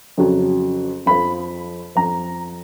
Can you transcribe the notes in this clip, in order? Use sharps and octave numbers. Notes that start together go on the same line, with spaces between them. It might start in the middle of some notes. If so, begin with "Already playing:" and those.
F2 C#3 F#3
F2 F3 B5
F2 F3 A#5